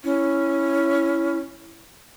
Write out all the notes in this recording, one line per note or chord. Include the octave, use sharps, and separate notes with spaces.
C#4 E4